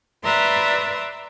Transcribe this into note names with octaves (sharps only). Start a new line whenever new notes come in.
B4 D5 E5 A#5 C6